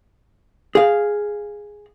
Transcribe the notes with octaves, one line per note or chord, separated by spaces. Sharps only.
G#4 F5